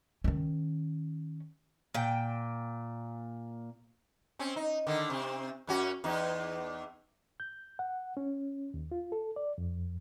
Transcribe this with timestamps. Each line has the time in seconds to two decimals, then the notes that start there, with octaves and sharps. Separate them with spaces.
0.24 D#3 C#4
1.94 A#2 G5
4.39 C4 C#4
4.56 D#4
4.87 D3 D#3
5.10 C3 C4
5.67 F#2 C#4 F#4
6.04 E2 D#4
7.40 G6
7.79 F#5
8.17 C#4
8.74 D#2
8.92 F4
9.12 A4
9.36 D5
9.58 F2